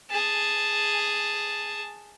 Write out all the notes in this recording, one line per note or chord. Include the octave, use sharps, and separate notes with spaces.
G#4 A5